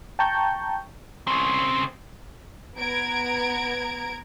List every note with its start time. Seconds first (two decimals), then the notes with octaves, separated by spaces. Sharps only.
0.19 G5 A5 A#5 C#6 G6
1.27 C#3 C4
2.78 B3 A#5 G#6 D7